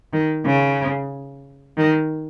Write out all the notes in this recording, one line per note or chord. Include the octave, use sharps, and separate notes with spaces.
D#3
C#3
D#3